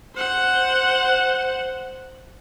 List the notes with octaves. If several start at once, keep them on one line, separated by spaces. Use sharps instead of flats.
C5 F#5